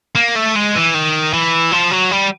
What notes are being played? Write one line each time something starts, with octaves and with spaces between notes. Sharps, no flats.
A#3
A3
G#3
E3
D#3
E3
F3
F#3
G3